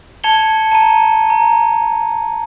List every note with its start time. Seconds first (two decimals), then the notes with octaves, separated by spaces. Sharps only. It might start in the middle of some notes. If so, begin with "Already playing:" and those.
0.24 A5 G#6 C#7 F7 G7
0.72 A5 A#5 D#7
1.30 A#5